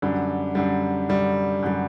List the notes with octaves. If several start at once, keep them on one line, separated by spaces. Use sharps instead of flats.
F#2 D3 G3
F#2 D3 G3
F#2 D3 G3
F#2 D3 G3